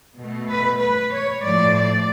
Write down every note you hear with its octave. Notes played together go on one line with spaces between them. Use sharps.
B2 A3
B4
B4
C#5
A2 F3 A3 D5
D5